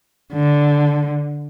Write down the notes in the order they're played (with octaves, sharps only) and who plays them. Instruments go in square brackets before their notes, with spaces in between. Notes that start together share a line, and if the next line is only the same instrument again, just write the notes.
[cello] D3